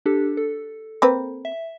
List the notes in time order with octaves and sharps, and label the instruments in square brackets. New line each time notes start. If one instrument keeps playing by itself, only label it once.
[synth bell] D4 G4 A4
A4
[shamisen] A#3 C4 B4
[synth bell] E5